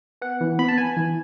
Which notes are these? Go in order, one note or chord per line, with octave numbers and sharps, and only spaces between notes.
B3 F#5
E3
B3 B5
A5
B3 G#5
E3